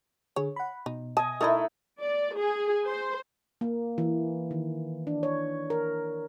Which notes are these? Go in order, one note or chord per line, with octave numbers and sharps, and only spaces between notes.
D3 G#4 C#5
F#5 B5
B2 D#4
D#5 G#5 A5
A3 D#4 E4 A#4 D#5
D5
G#4
C5
A#3
E3
D#3
D4
C#5
A#4